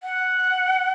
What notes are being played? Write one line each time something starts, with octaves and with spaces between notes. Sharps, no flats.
F#5